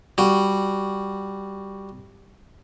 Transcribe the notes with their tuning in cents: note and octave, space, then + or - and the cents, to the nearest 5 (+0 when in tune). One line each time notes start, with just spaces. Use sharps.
G3 +0 F#4 +0